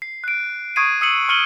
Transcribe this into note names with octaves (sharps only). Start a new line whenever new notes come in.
C7
F#6 D7
C#6 D#6 G#6 C7 D7 D#7
D#6 E6 C7 C#7 D#7 F#7
C#6 F6 C#7 D#7 F#7 G7